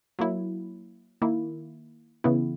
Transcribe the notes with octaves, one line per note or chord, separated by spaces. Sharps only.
F#3 A#3 E4
D#3 A#3 E4
C#3 E3 B3 E4